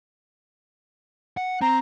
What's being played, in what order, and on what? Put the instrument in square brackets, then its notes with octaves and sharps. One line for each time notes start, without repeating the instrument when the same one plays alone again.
[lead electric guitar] F#5
[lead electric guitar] C4 [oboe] A#5